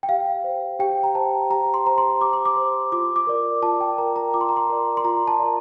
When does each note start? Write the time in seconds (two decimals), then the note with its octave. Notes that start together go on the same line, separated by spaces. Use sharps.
0.03 G5
0.09 G4 F5
0.44 C5
0.79 G4 G5
1.03 A#5
1.15 C5 A5
1.50 G4 A#5
1.74 C6
1.86 C5 A#5
1.98 C6
2.21 G4 D6
2.33 C6
2.45 D6
2.57 C5
2.92 F4 D6
3.16 D6
3.27 A#4 D5
3.62 F4 A5
3.81 G5
3.98 A#4 D5 A#5
4.16 A#5
4.34 F4 D6
4.41 C6
4.49 A#5
4.57 C6
4.69 A#4 D5
4.97 C6
5.04 F4 A#5
5.27 A5
5.39 A#4 D5